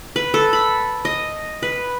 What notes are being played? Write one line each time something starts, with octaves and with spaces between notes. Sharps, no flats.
B4
A4
B5
D#5
B4